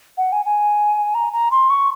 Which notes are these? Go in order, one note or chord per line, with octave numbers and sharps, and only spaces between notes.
F#5
G#5
G#5
A#5
A#5
C6
C#6